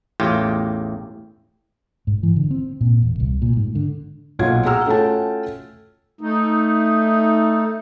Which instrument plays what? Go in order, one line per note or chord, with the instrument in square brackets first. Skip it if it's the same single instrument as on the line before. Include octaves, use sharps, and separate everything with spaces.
[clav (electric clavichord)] A1 E2 A2 F4 G4
[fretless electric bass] G#2
E3
D3
C4
A#2
E1
C2
A#2
G#2
D3
[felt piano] B1 A#2 F4 F#4 G#6
F#4 G#4 G5 A#5 E6 F6
A3 C#4 F4 F#4 G5 A5
[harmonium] A3 D#4